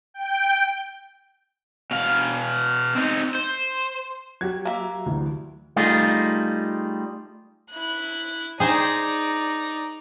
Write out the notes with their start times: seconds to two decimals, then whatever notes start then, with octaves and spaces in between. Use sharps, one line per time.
0.14 G5
1.91 B2 F5
2.95 C4 D#4
3.35 C5
4.41 F#3 F#4 G4 G#6
4.65 A#3 E5
5.06 D2 E3
5.76 G3 A3 D#4 F4 G#4
7.70 E4 F#6
8.60 D#4 G#4 C5 D5